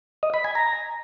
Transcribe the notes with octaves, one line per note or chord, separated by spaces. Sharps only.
D#5
B5
G#5
A#5